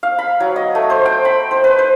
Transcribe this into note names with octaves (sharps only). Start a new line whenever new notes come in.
F5
B5
F#3
D#5
A3
C5
G5
B5
C5
B4
C5